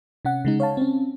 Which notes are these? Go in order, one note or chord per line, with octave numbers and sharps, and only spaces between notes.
C3 C#4 F#5
C#3 G#3 D#4
C#5 F5 A5
C4 C#4